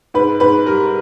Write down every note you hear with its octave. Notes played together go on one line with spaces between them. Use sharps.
G#2 B4
G#2 B4
G3 A#4